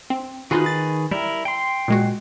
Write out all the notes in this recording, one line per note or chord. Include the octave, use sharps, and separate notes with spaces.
C4
D#3 D#4 F4 F#4 G#4 B4
A6
G3 E4 A#4
G5 C6
A#2 G#3 F#4